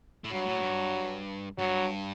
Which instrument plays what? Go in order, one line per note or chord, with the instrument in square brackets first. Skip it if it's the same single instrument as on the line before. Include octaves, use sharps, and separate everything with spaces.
[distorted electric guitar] A2
[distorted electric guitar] G2 [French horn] F#3
[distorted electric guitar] A2
G2
[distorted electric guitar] G2 [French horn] F#3